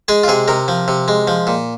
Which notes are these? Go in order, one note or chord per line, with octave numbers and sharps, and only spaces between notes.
G#3 G#4
F4
C3 G#4
C3 A#4
F3
C3
G#3
F3
A#2